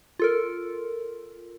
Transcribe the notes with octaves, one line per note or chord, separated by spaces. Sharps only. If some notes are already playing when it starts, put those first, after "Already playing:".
F4 A4 A#4